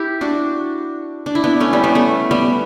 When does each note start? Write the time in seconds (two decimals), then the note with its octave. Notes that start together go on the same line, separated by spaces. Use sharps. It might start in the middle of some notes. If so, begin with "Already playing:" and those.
Already playing: E4 G4
0.21 D4 F#4
1.26 D4
1.35 E4
1.44 B3 D4
1.60 A3 C#4
1.73 G3 B3
1.84 G3 B3
1.95 A3
2.31 G3 B3